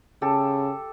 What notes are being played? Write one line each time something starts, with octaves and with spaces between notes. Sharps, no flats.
C#3 G4 A4